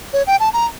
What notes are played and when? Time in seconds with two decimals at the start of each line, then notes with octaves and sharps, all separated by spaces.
0.13 C#5
0.27 G5
0.40 A5
0.53 A#5